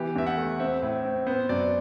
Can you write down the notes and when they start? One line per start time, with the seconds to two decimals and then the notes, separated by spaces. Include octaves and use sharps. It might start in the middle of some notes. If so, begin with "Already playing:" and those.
Already playing: E3 B3 G4
0.16 E2 E5
0.26 F#5
0.37 A3
0.60 C4 E5
0.82 A2
1.05 C4
1.27 B3 C5
1.49 F#2 D5